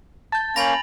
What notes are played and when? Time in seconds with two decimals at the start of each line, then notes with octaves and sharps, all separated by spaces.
0.32 A5 G6 A6
0.56 A#3 C#4 G#5 B5 A#6 F7 F#7